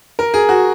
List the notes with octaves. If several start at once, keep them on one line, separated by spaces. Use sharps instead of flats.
A#4
G#4
F#4